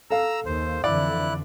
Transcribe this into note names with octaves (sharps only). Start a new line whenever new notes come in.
A4 F5 A#5 E6
D#2 C5
F2 D3 E3 E4 D5 F#6